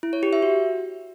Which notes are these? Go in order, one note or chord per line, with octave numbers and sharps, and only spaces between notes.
E4
C#5
G4
E5
F#4